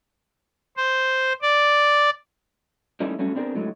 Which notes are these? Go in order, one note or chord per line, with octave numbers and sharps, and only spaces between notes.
C5
D5
D#3 G3 A3 A#3 C#4 E4
F#3 G3 A3 C#4
B3 C4 D4 G4 G#4 A#4
A2 D3 F#3 G#3